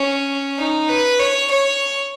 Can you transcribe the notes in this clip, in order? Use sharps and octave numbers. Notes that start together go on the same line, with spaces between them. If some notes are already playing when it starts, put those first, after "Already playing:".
Already playing: C#4
D#4
B4
C#5
C#5